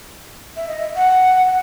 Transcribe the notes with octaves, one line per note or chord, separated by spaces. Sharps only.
E5
D#5
E5
F#5